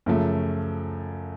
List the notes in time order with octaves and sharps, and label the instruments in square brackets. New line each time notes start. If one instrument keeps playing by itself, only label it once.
[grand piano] F#2 C#3 F3 A3